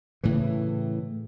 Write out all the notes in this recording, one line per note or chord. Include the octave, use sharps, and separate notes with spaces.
A2 C#3 E3